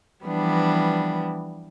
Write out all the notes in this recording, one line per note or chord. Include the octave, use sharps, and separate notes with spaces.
E3 F3 G3 B3 D4